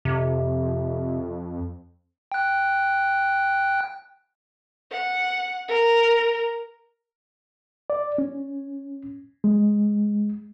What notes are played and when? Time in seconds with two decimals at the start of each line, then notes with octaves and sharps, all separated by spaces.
0.05 F2 C3
2.32 G5 F#6
4.91 F#5
5.68 A#4
7.90 D5
8.18 C#4
9.44 G#3